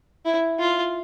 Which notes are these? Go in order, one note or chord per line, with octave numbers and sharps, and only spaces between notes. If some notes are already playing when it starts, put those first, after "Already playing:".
E4
F4